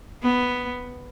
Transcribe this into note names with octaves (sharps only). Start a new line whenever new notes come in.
B3